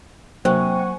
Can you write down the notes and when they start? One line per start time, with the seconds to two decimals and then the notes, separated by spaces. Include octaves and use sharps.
0.45 C3 F#3 A#3 D4 C5 F#5 G#5 C#6